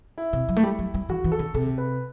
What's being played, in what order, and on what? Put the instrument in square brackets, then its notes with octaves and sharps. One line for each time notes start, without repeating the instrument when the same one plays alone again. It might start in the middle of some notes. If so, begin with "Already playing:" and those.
[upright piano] E4
[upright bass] C3
F#3
A3
G3
F#3
G3
[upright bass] E3 [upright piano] F#4
[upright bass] E3
[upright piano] A4
[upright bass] D3
[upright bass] C3 [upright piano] A4
[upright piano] B4